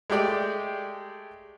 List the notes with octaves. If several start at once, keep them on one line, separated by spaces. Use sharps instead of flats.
G#3 A3 G4 D5